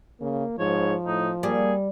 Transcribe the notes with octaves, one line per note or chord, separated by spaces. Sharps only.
C#3 A#3
G#2 F3 C#5
A2 D#4
G3 A#3 G#4